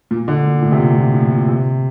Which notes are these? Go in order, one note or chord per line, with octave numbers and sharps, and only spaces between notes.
A#2
D3
A#2
A2
C3
A#2
A#2
A2
A#2
C3